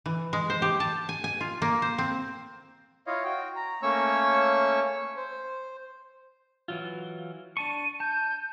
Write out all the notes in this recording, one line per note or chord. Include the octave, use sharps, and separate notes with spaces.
E3
G#3
C5
G4
A5
G#5
G#5
F4
A#3
C5
C4
E4 F4 C#5 D#5 F5
F#4 G5
A#5
A3 A#3 C#4 C#5 C#6 E6
C5
E3 F#3 F4
D4 A5 C#6 D#7
A5 G6